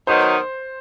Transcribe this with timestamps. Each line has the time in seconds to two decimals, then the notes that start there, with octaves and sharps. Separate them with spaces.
0.07 D#3 F#3 B3 D#4 C5